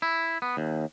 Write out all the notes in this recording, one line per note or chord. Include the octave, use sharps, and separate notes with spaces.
E4
B3
D#2